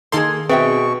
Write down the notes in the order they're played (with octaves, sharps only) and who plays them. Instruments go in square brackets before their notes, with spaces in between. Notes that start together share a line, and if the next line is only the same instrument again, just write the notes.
[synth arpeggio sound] D#3 A4 C6 [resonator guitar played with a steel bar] A#3 G#4
[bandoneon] B2 C#6 [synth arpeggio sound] C4 [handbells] G#4 [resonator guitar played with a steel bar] B4 E5 G5